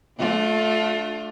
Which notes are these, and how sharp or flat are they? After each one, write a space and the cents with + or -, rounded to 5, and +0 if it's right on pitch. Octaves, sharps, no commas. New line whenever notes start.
A3 -15 D4 +0 F4 +20